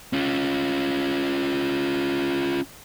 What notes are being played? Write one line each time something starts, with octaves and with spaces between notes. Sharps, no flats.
C#4 F4